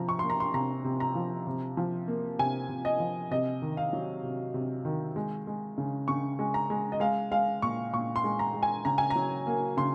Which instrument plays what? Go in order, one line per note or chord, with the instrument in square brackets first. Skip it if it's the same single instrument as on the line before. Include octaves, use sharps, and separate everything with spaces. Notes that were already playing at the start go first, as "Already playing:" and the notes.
Already playing: [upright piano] C3 F3 A#5
C#6
A#3 C6
A#5
C6
C3 A#5
C3
A#5
F3
C3
F3
A#3
C3 G#5
C3
D#5
F3
C3 D#5
D#3
F5
F#3
C3
C3
D#3
G#3
G#3
C#3
C#3 C#6
G#3
A#5
G#3
D#5
G#3 F5
G#3 F5
A#2 C#6
A#2 C#6
C6
G#3
A#5
G#3
G#5
C#3 A#5
G#5
A#5
F#3
A#3
C#3 C6